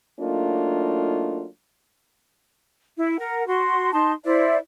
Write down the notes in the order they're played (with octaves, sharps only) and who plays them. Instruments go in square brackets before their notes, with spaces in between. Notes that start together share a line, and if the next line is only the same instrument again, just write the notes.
[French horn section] F#3 A3 A#3 D4 D#4 F4
[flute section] E4
A#4 F#5
F#4 C6
D#4 A5 C6
E4 C5 D5 E5